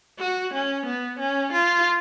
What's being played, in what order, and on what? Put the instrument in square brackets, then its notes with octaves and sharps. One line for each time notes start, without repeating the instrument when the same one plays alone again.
[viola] F#4
C#4
B3
C#4
F4